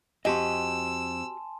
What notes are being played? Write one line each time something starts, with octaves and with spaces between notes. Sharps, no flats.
F2 F#4 G4 D#5 G#5 A5 C6 E6